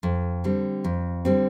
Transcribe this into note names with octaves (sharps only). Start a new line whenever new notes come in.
F2
D3 G3 C4
F2
D3 G3 C4